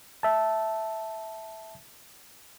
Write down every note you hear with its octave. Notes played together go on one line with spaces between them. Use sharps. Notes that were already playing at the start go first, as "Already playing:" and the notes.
E5 A5